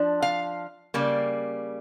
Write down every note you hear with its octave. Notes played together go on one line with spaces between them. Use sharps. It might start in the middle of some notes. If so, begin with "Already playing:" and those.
Already playing: F3 D4
F5
C#3 G3 A#3